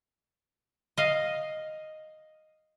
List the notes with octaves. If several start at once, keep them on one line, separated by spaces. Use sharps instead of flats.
D#5 F5